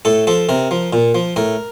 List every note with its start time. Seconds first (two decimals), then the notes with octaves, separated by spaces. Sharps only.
0.05 A2 A4
0.27 F3 A4
0.49 C3 A#4
0.71 F3
0.93 A#2
1.15 F3
1.36 A2 A#4